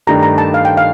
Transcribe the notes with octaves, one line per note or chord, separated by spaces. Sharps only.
G2 D#3 A3 D4 G4 A#5
A#5
A5
F5
G5
F5